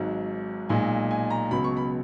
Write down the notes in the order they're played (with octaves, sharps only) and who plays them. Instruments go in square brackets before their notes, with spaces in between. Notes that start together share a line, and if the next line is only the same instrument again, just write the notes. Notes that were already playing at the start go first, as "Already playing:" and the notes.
Already playing: [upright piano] G#1 G#2 F#3
B1 A#2 G#3 G#5
G#5
A#5
C#2 B2 F#3 B5
C#6
B5